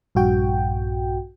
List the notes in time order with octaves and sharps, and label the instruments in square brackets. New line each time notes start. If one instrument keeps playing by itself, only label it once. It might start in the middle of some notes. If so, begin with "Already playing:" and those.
[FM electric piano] A#1 G2 F#4 G5